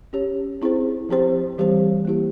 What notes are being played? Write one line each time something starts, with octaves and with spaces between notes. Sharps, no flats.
C#4 G4 C#5
C4 E4 G#4 C5
F3 C4 G4 C5
E3 G3 C4 G4 C5
A#3 E4 G4